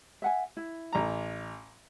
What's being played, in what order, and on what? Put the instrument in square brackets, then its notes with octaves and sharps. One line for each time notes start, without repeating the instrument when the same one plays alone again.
[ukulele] E5 F#5 G#5
E4
[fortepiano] A1 A#5